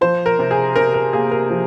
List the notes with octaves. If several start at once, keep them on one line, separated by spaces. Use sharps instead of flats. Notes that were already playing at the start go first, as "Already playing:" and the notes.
F3 C5
A#4
C3
G#4
C3 A#4
A#4
A#3 G#4
A#4
F3